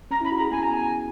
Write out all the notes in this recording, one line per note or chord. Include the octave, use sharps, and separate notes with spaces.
C#4 A#5
E4 B5
F#4
A#5
G#4
B3 G#5
A#5
G#5